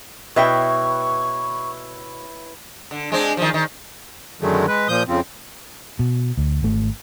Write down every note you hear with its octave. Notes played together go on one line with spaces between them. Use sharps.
B2 E4 B4 C#5 E5 G5 C#6
D3
G#3 C4 D4
D#3 F3
D#3
F#2 D3 D#3 F#3 G#3 A3
G#3 B4
A#2 F3 D#6 G6
F2 C#3 F3 C4
B2
D2
G#1 A3